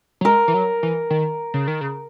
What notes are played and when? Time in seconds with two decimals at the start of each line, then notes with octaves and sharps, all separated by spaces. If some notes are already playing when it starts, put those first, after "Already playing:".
0.21 F#3
0.25 G#3 A#4
0.48 E3
0.54 F#3
0.83 E3
1.10 D#3
1.54 C#3
1.68 D#3
1.81 C#3